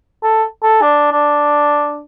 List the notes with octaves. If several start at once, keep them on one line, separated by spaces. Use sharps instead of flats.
A4
A4
D4
D4